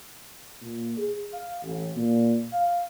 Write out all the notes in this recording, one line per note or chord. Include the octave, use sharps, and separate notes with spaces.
A#2
G#4
F5
A1
A#2
F5